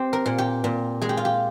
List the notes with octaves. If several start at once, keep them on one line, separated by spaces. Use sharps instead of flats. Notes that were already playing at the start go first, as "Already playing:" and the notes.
Already playing: C4 G4
A#4
A#2
G4
A#2
G#3 G#4
G4
F4
G4